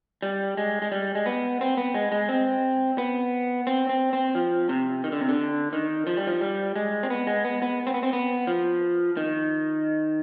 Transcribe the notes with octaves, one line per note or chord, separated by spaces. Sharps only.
G3
G#3
G#3
G3
G#3
B3
C4
B3
G#3
G#3
C4
B3
C4
C4
C4
F3
C3
D#3
D3
C3
D3
D#3
F3
G3
F3
G3
G#3
C4
B3
G#3
B3
B3
C4
B3
C4
B3
F3
D#3